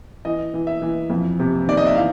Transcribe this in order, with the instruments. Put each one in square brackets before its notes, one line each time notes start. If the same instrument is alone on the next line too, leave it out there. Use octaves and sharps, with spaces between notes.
[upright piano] E3 D#5
E3
E5
E3
F2
C3
D#3 D5
D#5
E5
E3 F5